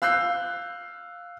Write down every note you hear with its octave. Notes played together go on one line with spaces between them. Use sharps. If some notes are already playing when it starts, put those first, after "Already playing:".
F5 E6 F#6 G6 C7